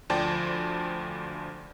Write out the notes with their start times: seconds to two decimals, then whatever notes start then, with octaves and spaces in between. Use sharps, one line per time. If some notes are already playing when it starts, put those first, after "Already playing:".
0.10 D2 F3 C5 D5 G5 A5